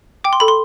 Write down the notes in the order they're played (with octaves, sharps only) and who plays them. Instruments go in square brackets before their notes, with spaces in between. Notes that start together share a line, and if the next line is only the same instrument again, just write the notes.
[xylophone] G5 D6
C6
A4 B5
C6